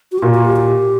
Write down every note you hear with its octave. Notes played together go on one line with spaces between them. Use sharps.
F#4
G4
A#2 F#4
F#4
G4
G4